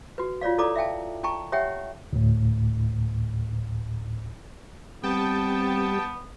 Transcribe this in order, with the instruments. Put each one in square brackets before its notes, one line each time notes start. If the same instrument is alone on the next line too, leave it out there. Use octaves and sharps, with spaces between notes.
[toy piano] F#4 B4
F4 C#5 D5 F5
E4 A4 D5 A#5 D6
E5 F5 G5 A5
D#4 G5 A5 A#5 C#6
G4 C#5 E5 F#5 G5
[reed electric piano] D2 A2
[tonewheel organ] G3 [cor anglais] B3 [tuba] C4 [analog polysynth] G5 A5